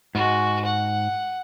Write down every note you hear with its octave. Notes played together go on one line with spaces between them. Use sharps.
G#2 G#3 F#4
F#5